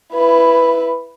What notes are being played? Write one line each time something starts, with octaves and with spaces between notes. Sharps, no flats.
E4 B4